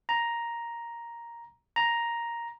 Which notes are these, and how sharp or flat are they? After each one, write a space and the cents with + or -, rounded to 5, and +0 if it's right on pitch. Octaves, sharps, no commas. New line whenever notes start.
A#5 +5
A#5 +5